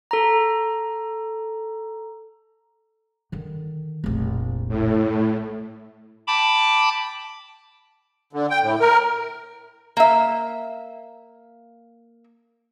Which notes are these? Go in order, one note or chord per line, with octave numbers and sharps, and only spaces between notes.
A4 A#5
D3 D#3
F1 A#1
A2
G5 A5 B5 D6
D3
G5
A2
A#4
A#3 E5